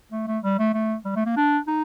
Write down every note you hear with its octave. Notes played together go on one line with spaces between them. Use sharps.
A3
A3
G3
A3
A3
G3
A3
A#3
D4
D#4